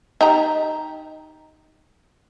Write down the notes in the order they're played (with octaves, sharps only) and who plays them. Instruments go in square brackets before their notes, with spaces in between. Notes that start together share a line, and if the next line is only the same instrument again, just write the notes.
[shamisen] D#4 G4 A#5